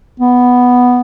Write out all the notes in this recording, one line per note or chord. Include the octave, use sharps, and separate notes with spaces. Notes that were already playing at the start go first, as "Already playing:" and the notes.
B3